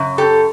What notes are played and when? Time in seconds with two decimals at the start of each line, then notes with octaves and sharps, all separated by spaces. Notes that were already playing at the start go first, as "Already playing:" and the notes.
Already playing: F#2 C#3
0.18 G4 A4